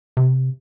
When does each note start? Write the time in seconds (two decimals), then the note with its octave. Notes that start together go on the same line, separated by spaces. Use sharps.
0.17 C3